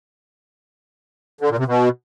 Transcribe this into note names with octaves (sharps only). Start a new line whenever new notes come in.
D3
A#2
C3
B2